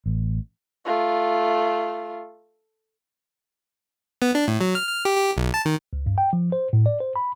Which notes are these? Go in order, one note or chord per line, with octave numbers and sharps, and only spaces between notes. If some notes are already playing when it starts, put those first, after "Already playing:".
A1
A3 F4
B3
D4
A2
F#3
F6
F6
G4
G4
B1
A5
D#3
C#2
G2
G5
F3
C5
A2
D5
C5
B5